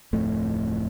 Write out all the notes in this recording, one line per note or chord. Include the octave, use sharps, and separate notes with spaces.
D1 F2 A2 A3